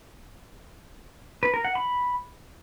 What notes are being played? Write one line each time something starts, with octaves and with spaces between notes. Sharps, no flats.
B4
A#4
F#5
B5